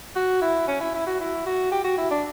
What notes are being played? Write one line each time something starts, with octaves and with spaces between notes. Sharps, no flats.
F#4
E4
C#4
E4
E4
F#4
E4
F#4
G4
F#4
E4
D4